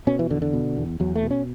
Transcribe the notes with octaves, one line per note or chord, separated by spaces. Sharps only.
B2 C#4
E3
E2 D3
D3
B2
E2
E2 F#3
A3
B2
C#4